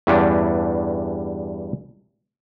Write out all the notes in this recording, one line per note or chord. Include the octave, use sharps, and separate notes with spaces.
E2 G2 E3 G3 C#4 D4